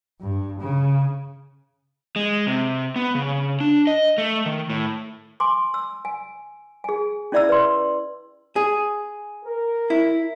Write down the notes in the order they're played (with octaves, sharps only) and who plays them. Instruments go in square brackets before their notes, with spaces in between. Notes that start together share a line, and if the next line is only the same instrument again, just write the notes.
[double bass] G2
C#3
[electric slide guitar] G#3
C3
B3
C#3
D4
D#5
A3
D#3
A2
[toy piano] G#5 C6 D6
E6
G#5
G#4 G#5
C#4 E4 D5 E5 A#5 E6
B4 C6
[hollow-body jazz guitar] G#4
[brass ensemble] A#4
[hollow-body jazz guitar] E4